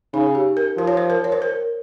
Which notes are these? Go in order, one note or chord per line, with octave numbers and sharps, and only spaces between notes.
C#3 D#4
G4
A#4
F3 C5
C#5
C5
A#4
C#5
C5
A#4